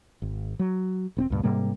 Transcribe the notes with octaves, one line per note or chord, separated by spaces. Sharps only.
G#1
F#3
E1 B3 C4
C#2 G2 A#2
G#2 C3 G3 A#3